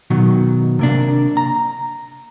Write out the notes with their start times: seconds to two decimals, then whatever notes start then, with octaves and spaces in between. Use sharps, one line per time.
0.10 B2 D#3 F#3
0.79 C3 A#3 D4
1.37 A#5